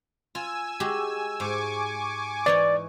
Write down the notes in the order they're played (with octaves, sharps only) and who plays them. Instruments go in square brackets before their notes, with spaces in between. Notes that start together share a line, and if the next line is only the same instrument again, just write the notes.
[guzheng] F4 [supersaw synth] G#5 E6
[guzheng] G#3 F#4 G4
[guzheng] G#2 [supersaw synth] G#5 C#6 D6
[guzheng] E3 D#4 C#5 [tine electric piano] D5